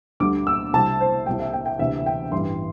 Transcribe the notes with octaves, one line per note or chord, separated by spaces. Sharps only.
D2 D3 G3 D6
E6
C2 C3 G3 A5
C5
C2 C3 G3 G5
E5
G5
G5
D2 C3 E3 E5
G5
A1 G2 E3 G3 C6